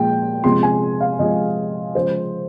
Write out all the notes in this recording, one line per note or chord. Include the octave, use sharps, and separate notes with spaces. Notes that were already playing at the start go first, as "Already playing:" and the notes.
Already playing: A#2 F3 G#3 G5
C3 F3 G#3 C6
G#5
F5
C3 F3 G#3 D#5
C#3 F3 G#3 C5